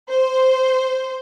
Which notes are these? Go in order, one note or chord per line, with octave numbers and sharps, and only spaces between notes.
C5